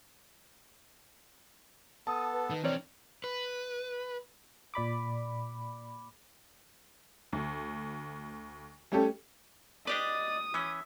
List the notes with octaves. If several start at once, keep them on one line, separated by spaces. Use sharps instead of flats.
B3 A4 A5 D#6
B4
D#3
E3 C4 D4 A#4 C#5 D5
B4
A#2 D5 B5 D6
D2
G3 A3 C#4 G4 A4
D4 G4 B4 D5 D#5 D#6
E3 C#4 E5